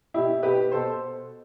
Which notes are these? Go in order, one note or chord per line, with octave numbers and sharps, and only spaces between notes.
B2 E4 G4
B2 G4 B4
B2 A4 C5